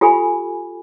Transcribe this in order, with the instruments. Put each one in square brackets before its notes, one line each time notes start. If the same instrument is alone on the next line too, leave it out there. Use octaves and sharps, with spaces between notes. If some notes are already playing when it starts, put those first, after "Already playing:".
[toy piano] F4 G4 A4 G#5 B5